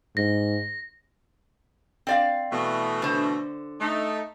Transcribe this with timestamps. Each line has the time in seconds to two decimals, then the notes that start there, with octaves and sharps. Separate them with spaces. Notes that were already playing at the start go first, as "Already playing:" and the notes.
0.17 G#2 A#6
2.07 C4 D5 F5
2.52 B2 E3 A3
3.02 D3 C5
3.81 A3 D#4